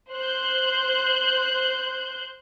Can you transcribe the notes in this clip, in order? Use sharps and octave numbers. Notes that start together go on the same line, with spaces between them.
C5 F#6 G6